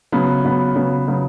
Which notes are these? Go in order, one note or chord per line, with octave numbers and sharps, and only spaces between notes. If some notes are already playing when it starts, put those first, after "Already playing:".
C#3 F#3 B3
C#3 F#3 B3
C#3 F#3 B3
C#3 F#3 B3